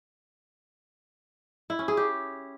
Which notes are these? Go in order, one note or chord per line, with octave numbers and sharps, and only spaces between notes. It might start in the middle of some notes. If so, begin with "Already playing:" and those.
E4
C#4
G#4
G4